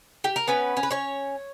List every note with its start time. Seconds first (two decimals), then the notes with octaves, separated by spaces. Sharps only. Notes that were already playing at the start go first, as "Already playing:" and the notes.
0.24 G4
0.36 A#4
0.48 B3 C#4 B4
0.77 C#4
0.83 B4
0.91 C#4 C#5